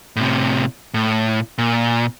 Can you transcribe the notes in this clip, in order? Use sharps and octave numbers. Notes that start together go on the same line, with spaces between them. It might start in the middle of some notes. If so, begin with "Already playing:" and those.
A2 C3
A2
A#2